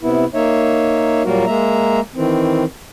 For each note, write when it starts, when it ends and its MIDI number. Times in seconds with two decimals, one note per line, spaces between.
0.03 0.25 48
0.03 0.25 59
0.03 0.25 64
0.34 1.23 58
0.34 1.23 63
0.34 1.23 73
0.34 1.23 76
1.25 1.45 46
1.25 1.45 54
1.25 1.45 55
1.25 1.45 58
1.25 1.45 66
1.25 1.45 70
1.47 2.00 56
1.47 2.00 58
1.47 2.00 76
1.47 2.00 82
2.15 2.64 51
2.15 2.64 52
2.15 2.64 60